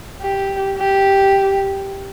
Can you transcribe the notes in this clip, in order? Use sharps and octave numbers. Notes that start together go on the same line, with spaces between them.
G4
G4